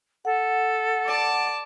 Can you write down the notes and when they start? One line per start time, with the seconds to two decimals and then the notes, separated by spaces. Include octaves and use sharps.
0.25 A4 F#5
1.06 D5 A5 D6